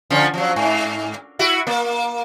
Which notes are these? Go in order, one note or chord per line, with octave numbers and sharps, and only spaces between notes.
D3 F3 C#4
F3 F#3
G#2
E4 F#4
A#3